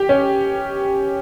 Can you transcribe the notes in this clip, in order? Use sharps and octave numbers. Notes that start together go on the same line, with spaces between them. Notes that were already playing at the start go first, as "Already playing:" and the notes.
Already playing: G4
C#4